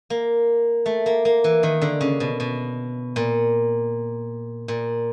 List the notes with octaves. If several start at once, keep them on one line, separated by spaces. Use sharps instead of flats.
A#3
A3
A#3
A#3
E3
D#3
D3
C#3
B2
B2
A#2
A#2